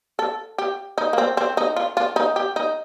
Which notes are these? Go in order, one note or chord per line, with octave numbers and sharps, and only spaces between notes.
A4
G4
D#4
A#3
C4
C4
D#4
F4
F4
D#4
G4
D#4